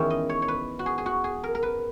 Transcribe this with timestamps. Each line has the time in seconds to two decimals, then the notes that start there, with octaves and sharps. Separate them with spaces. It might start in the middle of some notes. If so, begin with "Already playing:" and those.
Already playing: E2 D#3 G#3 C#4 E4
0.10 D#5
0.29 C#5
0.42 C#5
0.48 B4
0.79 F#4
0.86 G#4
0.98 G#4
1.06 F#4
1.24 G#4
1.44 A#4
1.55 A#4
1.63 B4